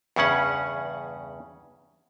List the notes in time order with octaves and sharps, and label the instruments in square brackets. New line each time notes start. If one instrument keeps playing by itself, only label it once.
[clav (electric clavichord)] E2 G2 C#3 C#4 F#5